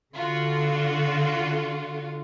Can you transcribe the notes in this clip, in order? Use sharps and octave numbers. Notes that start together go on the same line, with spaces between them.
D3 F4 F#4